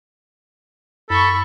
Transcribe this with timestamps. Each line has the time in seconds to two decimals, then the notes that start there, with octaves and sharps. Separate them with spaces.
1.10 F#2 A4 B5 C#6